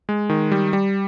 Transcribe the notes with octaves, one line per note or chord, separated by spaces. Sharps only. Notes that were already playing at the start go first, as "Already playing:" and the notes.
G#3
D#3
G3
G3